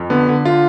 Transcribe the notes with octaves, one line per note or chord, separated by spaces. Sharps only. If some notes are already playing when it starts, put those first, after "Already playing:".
Already playing: F2
D3 B3
D3
D3 F4